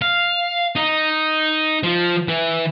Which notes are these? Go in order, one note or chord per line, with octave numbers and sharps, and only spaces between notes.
F5
D#4
F3
E3